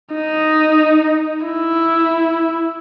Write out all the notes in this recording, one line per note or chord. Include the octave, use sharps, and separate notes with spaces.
D#4
E4